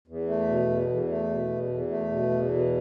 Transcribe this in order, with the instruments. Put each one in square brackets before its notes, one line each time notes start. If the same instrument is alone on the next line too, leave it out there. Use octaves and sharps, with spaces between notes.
[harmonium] E2
A3
B2
E2
E2
A3
B2
E2
E2
A3
B2
E2
B2